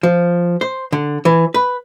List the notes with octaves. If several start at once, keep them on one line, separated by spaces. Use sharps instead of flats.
F3
C5
D3
E3
B4